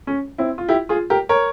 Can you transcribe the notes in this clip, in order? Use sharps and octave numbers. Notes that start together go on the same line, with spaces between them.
C#4
C4 E4
F4
E4 G4
F4 G#4
G4 A#4
A#4 C#5